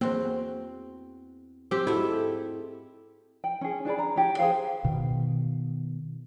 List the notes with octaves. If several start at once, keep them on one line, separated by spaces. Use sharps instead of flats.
E2 A#3 C4 F#4 C5
C4 G4 D6 E6
G#2 A3 E4 F#4 G4
G5
C#4 G#4
D4 G#4 D5 B5
A#5
G4 C#5
G#4 B4 C5 F5
B2 D#3